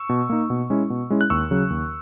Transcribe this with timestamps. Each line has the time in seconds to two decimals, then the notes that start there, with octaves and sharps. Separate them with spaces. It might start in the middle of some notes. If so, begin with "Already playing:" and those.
Already playing: C#6 E6
0.09 B2
0.30 A#3 D#4
0.50 B2
0.70 G#3 C#4 E4
0.90 B2
1.10 G#3 C#4 E4
1.21 F#6
1.30 D#2 C#6 E6
1.51 C#3 F#3
1.70 D#2